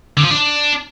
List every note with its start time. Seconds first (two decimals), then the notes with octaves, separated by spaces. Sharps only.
0.17 D3
0.24 F3
0.30 D4